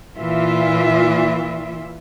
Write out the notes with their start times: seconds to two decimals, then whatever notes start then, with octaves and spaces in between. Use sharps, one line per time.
0.18 A#2 E3 F4 E5